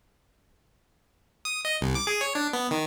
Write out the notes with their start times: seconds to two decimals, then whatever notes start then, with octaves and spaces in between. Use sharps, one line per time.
1.45 D#6
1.65 D#5
1.81 C2
1.95 D6
2.07 G#4
2.21 C#5
2.35 D4
2.53 B3
2.71 D#3